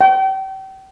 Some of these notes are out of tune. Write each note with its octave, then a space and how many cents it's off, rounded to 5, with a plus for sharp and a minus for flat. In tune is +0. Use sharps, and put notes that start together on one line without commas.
G5 -35